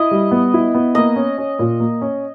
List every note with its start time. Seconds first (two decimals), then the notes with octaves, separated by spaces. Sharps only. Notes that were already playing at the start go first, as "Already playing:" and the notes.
Already playing: E4 D#5
0.11 G3
0.31 B3
0.54 E4
0.74 B3
0.95 A#3 D#5
1.16 C#4
1.38 C#4
1.59 A#2
1.80 A#3
2.01 C#4